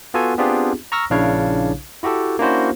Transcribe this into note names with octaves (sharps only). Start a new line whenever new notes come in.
B3 F4 F#4 A4 G#5
B3 C4 D4 F4 G4 G#4
A#5 C#6 E6 F6 A#6
A#1 C#3 D4 E4 C#5 F5
E4 F#4 G4 A4
A#3 C#4 D4 E4 F#4 C5